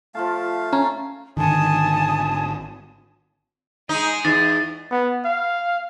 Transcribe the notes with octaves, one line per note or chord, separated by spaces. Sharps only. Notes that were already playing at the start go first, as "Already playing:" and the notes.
F3 A3 F4 F5 A5
C#4 A#5
G#1 D3 D#3 G#5 A5 D#6
G#3 D#4 G#4
E2 D#4 A6
B3
F5